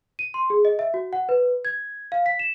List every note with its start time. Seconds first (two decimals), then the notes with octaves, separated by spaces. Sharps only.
0.19 D#7
0.34 C6
0.50 G#4
0.65 D#5
0.79 E5
0.94 F#4
1.13 F#5
1.29 B4
1.65 G#6
2.12 F5
2.26 B6
2.39 E7